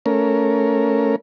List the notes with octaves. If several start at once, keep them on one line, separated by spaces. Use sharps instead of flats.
A3 C#4 A#4